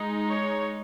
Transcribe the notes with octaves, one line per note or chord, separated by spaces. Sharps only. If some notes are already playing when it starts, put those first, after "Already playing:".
Already playing: G#3 D#4
C#5